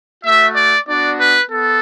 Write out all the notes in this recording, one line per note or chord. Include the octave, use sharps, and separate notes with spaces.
A3 F#4 E5
D5
B3 D4 F#4 D5
B4
B3 A4